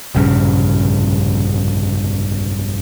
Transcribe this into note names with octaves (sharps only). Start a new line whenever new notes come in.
F1 A#1 G2 C#3